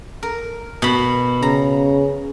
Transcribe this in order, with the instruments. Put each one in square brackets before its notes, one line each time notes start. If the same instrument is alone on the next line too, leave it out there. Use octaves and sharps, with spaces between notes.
[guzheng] A#4
B2 B5
[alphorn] C#3 [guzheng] A#5